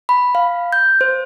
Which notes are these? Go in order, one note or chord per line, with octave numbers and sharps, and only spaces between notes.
B5
F5
G6
C5